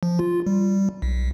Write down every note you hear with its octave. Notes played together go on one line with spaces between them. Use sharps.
F3
F4
G3
B1